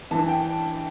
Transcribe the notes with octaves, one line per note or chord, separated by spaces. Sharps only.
G2 E3 A5
G5